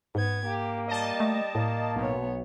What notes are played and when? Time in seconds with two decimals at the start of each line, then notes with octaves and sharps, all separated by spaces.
0.15 G#2 B3 G#6
0.44 A#3 G4
0.88 G3 D#5 A5
1.20 A3
1.55 A2 A#3
1.96 B1 B3 C#5